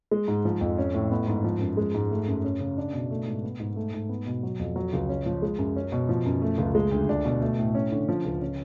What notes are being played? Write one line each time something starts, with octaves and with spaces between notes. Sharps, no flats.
G#3
G#2
F3
F2
C#4
A2
B3
G#2
F3
F#2
G#3
G#2
A3
F#2
C#4
C#3
D4
B2
A3
G#2
B3
G#2
A3
G#2
B3
B2
F#3
F2
F#3
C#2
C#4
F3
G#3
F#2
C#4
B2
F3
F#2
A3
C#2
G#3
D2
D4
B2
A3
A2
C#4
D3
F3
C#2
C#4